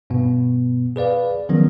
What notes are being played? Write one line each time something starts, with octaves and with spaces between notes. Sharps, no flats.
G2 B2 B3
G#4 B4 D5 F5
D#3 F3 F#3 B3 C#4